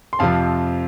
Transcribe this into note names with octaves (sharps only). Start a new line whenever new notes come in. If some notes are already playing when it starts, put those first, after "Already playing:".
C6
F2 C3 F3 F5 A5